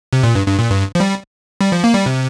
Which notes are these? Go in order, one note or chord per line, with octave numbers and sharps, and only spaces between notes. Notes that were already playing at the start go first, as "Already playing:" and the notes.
C3
A#2
G2
G2
A#2
G2
F3
G3
G3
F3
A#3
G3
C3